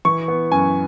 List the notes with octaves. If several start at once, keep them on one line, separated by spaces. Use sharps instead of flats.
E3 C#6
B3
F#2 G#5